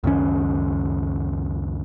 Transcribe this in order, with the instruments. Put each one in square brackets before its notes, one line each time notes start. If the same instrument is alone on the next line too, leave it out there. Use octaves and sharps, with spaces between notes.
[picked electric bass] C#2 F#2 D#3 C#4